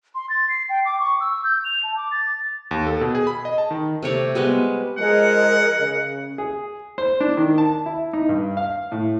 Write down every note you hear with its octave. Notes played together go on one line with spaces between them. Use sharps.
C6
A6
C7
G5
D6
C#6
E6
G6
F7
A5
D6
A6
D#2
A4
B2
G#4
B5
D#5
A5
D#3
C3 A3 C#5 D5
G3 G#3 B3 D#5
F3 G#3 G#4 A#4 D#5 F#5
C#3
G#4
C5
D4
D#3
A5
E4
D#4
G2
F5
A2